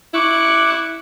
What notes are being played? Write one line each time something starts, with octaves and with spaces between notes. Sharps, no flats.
E4 C#6 D6 F#6